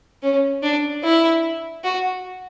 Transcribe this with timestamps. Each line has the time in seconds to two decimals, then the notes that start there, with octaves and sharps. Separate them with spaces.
0.23 C#4
0.63 D4
1.04 E4
1.84 F#4